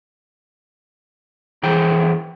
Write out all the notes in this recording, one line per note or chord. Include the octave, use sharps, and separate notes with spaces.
F2 E3 G#4 G5